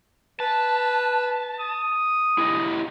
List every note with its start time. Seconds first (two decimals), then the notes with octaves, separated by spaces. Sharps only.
0.40 B4 A5
1.60 D#6
2.38 E4 G4 D#5